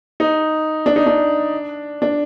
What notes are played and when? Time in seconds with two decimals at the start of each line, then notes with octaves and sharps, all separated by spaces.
0.20 D#4
0.86 D4
0.96 D#4
1.06 D4
2.02 D4